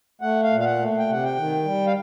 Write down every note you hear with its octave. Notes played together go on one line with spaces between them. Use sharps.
A3 F#5
F5
A#2
F5
F#5
A3
G5
C3 F#5
G5
D#3
G3
F5